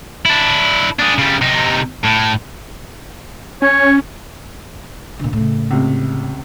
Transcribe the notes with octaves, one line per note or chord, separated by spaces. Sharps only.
D4 E4
D4 G#4
C#3 G3
C3 D#4
A2
C#4 C#5
A#2 D3
A2 C#3
C#2 C3